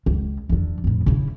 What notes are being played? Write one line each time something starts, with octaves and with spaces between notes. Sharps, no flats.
C#2
E2 D3
F2 A2
C#3 E4